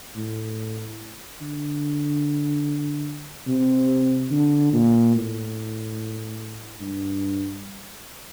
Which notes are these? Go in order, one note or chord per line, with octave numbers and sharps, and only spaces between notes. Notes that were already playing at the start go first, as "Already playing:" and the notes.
A2
D3
C3
D3
A#2
A2
G2